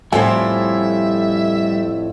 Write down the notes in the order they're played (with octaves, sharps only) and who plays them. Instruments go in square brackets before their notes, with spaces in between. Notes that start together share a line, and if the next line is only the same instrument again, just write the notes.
[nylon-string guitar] F2 A2 C4 [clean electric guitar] G3 F#5 G#5 [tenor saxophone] E5